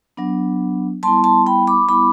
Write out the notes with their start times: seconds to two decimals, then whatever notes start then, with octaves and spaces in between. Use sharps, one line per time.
0.17 F#3 B3 D4
1.03 G3 B3 E4 A5 C6
1.24 A5 C6
1.46 G5 B5
1.67 B5 D6
1.89 G3 B3 E4 B5 D6